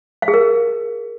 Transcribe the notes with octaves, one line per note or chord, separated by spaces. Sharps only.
F5
G#4
A#4